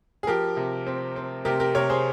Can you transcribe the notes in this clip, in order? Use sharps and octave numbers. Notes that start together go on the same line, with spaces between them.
G#4
F3 G4 A#4
C3
C4
C4
C3 G4 A#4
G4 A#4
C3 A#4 C#5
G#4 C5